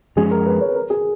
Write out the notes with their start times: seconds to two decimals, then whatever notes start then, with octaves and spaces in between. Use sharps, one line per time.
0.16 F#2 F3 G#3 C#4 G#4
0.31 A#4
0.46 B4
0.61 C#5
0.69 B4
0.75 A#4
0.90 G#4